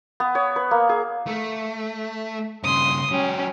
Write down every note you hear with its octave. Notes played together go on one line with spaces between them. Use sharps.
B3
C#5
B4
A#3
G#4
A3
G2 C#3 C6 D#6
F#3 C#4 G4